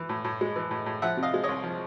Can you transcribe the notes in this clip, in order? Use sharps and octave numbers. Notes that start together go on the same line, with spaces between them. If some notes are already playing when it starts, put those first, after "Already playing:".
Already playing: E3
A2
A2
G#3
E3
A2
A2
F3 E5 F#5
C3
D#5 F5
G#3
C2 C#5 D#5
F3